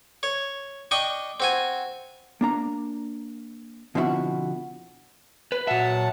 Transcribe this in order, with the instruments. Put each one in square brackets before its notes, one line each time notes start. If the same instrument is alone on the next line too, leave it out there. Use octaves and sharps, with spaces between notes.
[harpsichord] C#5
D4 D#5 G5 C#6
C4 F#4 G#5
[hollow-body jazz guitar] A#3 D4 A#5
B2 D3 F3 C4 E4 F#4
[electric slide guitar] B4
[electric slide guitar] A#2 E5 [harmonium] F#3 F#5 A5